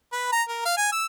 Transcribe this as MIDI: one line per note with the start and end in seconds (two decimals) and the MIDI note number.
0.13 0.28 71
0.32 0.43 82
0.49 0.62 70
0.65 0.74 77
0.77 0.91 80
0.92 1.06 88